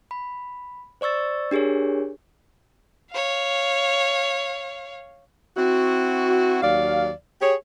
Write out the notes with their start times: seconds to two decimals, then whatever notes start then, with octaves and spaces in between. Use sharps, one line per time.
0.11 B5
1.01 C5 D5 C#6 E6 A6
1.51 D4 G4 G#4 A#4 C#5
3.11 C#5 F5
5.57 C4 E4 F#4
6.62 D#2 F#3 D5 F5
7.41 G4 G#4 C#5